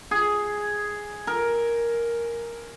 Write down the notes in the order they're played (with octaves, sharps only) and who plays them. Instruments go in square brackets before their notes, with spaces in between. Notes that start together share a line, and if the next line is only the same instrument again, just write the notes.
[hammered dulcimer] G#4
A#4